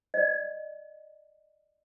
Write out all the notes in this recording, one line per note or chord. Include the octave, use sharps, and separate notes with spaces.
D5 D#5